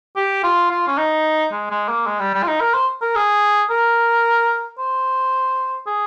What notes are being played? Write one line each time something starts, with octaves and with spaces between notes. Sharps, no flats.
G4
F4
F4
C#4
D#4
G#3
G#3
A#3
G#3
G3
G3
F4
D#4
A#4
C5
A#4
G#4
A#4
C5
G#4